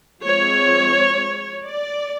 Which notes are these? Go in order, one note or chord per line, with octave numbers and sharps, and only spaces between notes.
F3 G#3 C4 C#5
D5